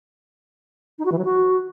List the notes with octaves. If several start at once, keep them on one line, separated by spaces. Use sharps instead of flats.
D#4
F#4
E3
F#3
F#4